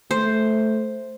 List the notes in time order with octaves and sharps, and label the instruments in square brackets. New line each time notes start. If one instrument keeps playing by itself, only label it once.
[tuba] A3 [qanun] C5